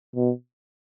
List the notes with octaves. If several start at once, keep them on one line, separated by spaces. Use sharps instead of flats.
B2